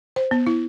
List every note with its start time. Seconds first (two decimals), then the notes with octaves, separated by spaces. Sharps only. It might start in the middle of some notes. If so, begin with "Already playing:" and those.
0.16 C5
0.31 B3
0.46 E4